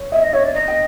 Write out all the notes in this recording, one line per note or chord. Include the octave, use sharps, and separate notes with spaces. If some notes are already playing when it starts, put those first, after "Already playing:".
Already playing: C#5
D#5 E5
D#5
C#5 E5
D5
D#5
G5